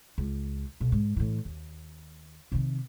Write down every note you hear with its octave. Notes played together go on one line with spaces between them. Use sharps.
C#2
B1
G#2
A2 E3
D#2
C3 D#3